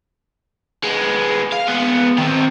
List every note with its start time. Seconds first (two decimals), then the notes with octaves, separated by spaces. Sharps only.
0.83 G#3 B3
1.52 F5
1.67 G#3 B3
2.18 D#3 C4